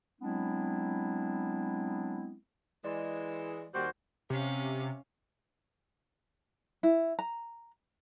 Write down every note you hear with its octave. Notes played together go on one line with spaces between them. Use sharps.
F#3 G#3 B3 C4 D4 E4
E3 G#3 D5 C6
D#2 G3 F#4 C5
C3 C#4 F5
E4
A#5